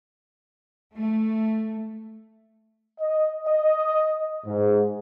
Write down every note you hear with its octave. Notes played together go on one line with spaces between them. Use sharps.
A3
D#5
D#5
G#2